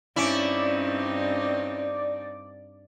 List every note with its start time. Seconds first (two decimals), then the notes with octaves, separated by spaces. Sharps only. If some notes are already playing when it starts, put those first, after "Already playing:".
0.16 G2 C4 C#4 D#4 E4 D5